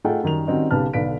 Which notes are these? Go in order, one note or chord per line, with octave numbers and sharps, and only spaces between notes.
A3 D#4 F4 G#4 F#5 G5
F#2 D#3 G3 F7
D#3 G3 C4 C#4 D#4 F#4
B1 C#3 G4 B4 A5 F6
B1 D3 B4 F5 B6 D7